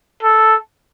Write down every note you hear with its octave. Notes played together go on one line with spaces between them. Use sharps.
A4